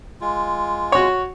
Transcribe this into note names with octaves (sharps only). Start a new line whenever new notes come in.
G#3 F4
F#4 C#5